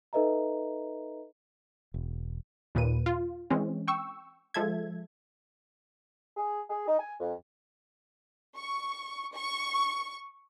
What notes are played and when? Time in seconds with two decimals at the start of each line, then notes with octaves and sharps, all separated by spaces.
0.13 D#4 A4 B4 D#5 E5 A#5
1.94 E1
2.75 D#2 A#2 B4 D#7
3.06 F4
3.50 E3 G#3 C4 C#4
3.88 G5 C#6 E6
4.54 F3 G#3 A4 E5 G#6
6.37 G#4
6.70 G#4
6.87 D#4
6.99 G#5
7.20 F2
8.56 C#6
9.34 C#6